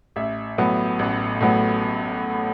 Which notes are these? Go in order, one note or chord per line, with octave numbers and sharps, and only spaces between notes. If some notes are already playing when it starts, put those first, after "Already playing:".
A1 E5
A2 F#3 B3
A1
A2 F#3 B3